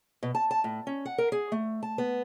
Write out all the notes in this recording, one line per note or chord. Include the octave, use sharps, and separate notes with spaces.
B2
A5
A5
A2
C#4
F#5
A#4
G#4
A3
A5
B3